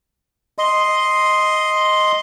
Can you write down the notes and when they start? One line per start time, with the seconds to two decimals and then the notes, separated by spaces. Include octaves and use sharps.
0.58 D#5 C6